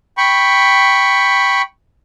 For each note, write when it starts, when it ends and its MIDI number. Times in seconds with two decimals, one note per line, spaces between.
0.17 1.62 79
0.17 1.62 83
0.17 1.62 85